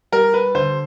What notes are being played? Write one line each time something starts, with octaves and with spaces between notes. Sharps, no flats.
G3 A#4
B4
D3 C5